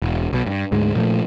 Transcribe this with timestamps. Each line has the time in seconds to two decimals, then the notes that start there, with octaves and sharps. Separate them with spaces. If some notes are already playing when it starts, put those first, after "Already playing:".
0.02 E1
0.33 B1 B2
0.47 G2
0.72 D2 G#2 G#3
0.96 A#2 F3 A3